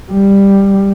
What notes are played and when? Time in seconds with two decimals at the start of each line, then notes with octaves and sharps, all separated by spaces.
0.12 G3